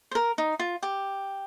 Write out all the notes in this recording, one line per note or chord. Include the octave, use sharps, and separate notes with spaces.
C5
A#4
D#4
F4
G4